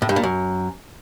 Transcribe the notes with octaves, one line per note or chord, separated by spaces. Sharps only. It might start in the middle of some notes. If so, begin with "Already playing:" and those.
A2
G2
A#2
F#2